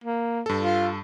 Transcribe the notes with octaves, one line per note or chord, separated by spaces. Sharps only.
A#3
G2 A4
F4